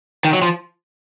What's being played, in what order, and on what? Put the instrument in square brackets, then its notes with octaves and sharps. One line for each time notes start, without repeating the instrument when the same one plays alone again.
[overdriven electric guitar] D#3
F#3
F3